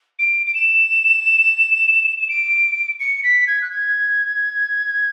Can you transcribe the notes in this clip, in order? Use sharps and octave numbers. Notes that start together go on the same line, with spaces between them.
D7
D7
E7
E7
D7
C#7
B6
G#6
F#6
G#6